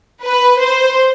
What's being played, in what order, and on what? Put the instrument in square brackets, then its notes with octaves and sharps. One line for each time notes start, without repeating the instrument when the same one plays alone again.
[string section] B4
C5